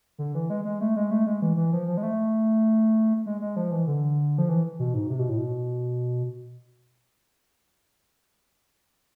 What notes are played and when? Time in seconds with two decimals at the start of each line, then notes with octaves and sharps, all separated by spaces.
0.18 D3
0.34 E3
0.50 G#3
0.65 G#3
0.81 A3
0.96 G#3
1.11 A3
1.26 G#3
1.42 E3
1.57 E3
1.73 F3
1.88 F3
1.97 G#3
2.03 A3
3.26 G#3
3.41 G#3
3.56 F3
3.71 E3
3.87 D3
4.38 F3
4.49 E3
4.79 B2
4.94 G#2
5.10 C3
5.19 B2
5.29 A2
5.38 B2